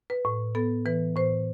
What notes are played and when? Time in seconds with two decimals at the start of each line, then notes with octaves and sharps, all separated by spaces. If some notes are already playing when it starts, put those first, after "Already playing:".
0.10 B4
0.25 A2
0.55 B3 A4
0.86 E3 B4
1.16 A2 C5